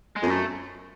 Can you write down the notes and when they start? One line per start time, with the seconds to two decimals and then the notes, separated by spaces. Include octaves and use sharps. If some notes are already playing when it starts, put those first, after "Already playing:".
0.16 G#3
0.22 F2
0.27 F#2 A3